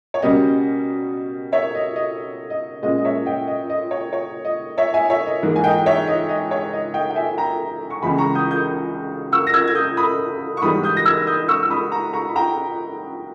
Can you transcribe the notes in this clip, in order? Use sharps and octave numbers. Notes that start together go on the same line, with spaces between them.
C#5
B2 G3 A#3 C#4 D#5
C#5 E5
D#5
D#5
D#5
A#2 G#3 C#4 D#5
D#5
C#5 E5
D#5 G5
D#5
D#5
C#5
C#5
D#5
C#5 E5
E5 G#5
C#5 E5
D#5
G#2 E3 A#3
G#5
D#5 G5
C#5 E5
D#5
D#5
C#5
D#5
D#5 G5
G5
E5 G#5
G5 A#5
C#6
C#2 C#3 E3 G#3 G#5 B5
A#5 C#6
D#6 G6
D#6 G6
C#6 E6
A#6
E6 G#6
G#6
D#6 G6
B5 D#6
C#6
G#2 E3 G3 B3 B5 D#6
D#6 G6
A#6
E6 G#6
D#6 G6
C#6 E6
E6
B5 D#6
A#5 C#6
A#5 C#6
B5
G5 A#5